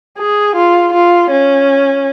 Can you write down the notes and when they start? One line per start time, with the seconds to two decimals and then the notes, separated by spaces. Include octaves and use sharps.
0.19 G#4
0.56 F4
0.93 F4
1.31 C#4